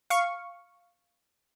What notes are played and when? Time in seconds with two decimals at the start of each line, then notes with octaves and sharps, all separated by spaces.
0.10 F5 C#6